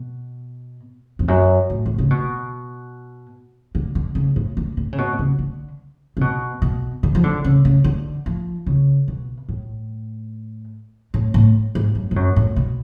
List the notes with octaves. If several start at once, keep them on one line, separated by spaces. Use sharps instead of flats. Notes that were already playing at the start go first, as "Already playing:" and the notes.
Already playing: B2
F2
F#2
A2
D3
C#3
B2
D3
D3
C#3
A2
D3
D3
C#3
B2
C#3
D3
C#3
B2
B2
D3
F3
D3
C#3
C#3
D3
F3
C#3
B2
A2
A2
A2
G#2
F#2
G#2
F#2
A2
B2